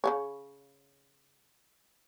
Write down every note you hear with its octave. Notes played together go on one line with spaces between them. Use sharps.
C#3 A3 C#5